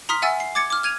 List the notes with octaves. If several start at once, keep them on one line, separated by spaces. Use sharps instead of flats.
A#5 C6 D#6 F6 B6
E5 F#5 G#5 E6 A6
C7
D6 G#6 A6 C#7
D6 F6
F6 G#6 D#7 F7